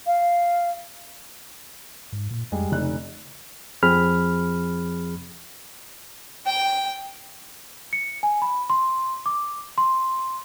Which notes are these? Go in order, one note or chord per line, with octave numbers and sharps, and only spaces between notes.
F5
G#2
A#2
F2 G3 G#3
F1 C#3 D#4 F#6
F2 F3 C4 G#4 B5 F6
G5
C#7
G#5
B5
C6
D6
C6